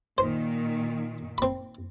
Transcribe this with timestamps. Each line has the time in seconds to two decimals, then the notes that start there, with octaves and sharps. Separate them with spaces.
0.18 A#2 D#3 C5
1.38 C4 B5